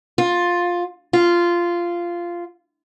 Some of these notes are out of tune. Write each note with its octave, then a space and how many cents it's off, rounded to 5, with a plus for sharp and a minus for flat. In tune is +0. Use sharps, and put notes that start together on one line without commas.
F4 +10
F4 -10